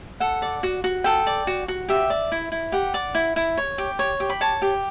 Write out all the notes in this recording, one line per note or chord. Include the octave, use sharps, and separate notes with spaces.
A4 F#5
D5
F#4
F#4
A4 G5
D5
F#4
F#4
G4 E5
D5
E4
E4
G4 F#5
D5
E4
E4
C#5
G4
C#5
G4
B5
C#5 A5
G4